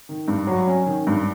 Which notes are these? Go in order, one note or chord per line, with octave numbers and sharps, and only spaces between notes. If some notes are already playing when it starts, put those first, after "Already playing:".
D#3
G2
F#3
C#4
D#3
G2